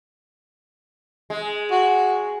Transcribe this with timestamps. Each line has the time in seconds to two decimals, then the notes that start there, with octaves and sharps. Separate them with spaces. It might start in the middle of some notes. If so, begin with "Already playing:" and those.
1.30 G#3
1.71 F#4